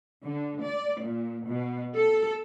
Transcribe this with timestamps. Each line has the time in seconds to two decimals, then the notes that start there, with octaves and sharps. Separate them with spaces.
0.23 D3
0.61 D5
1.02 A#2
1.47 B2
1.95 A4